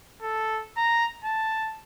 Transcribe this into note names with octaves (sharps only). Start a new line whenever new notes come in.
A4
A#5
A5